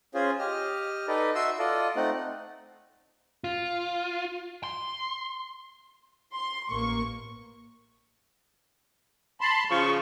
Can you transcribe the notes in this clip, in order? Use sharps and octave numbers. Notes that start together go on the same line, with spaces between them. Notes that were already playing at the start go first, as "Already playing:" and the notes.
C#4 F4 G#4 C5
G4 D#5 F6
D#4 A4 B4 D5 D#5
F#4 E5 C6 D#6 E6
F4 A4 D5 D#5
A3 C4 D#4 F#5
F4
C6
C6
A1 A#3 C#6
A5 B5 C6
C#3 F3 C#6